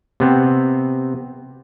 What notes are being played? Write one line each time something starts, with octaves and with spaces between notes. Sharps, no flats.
C3 B3 C4